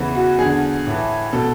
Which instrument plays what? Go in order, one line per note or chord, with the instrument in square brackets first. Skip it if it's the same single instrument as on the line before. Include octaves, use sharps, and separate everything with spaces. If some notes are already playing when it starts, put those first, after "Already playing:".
Already playing: [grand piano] E2 C#3 E3
F#4
E2 D3 G#4
A2 E3
B2 A4